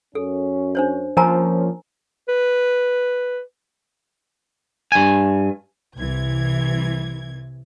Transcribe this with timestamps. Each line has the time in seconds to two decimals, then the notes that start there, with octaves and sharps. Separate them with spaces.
0.15 F#2 C#4 A4
0.75 D4 C5 C#5
1.17 F3 A#3 C#4 A#4 G#5 A#5
2.29 B4
4.92 G2 G#5
5.96 C2 C3 E3 G#6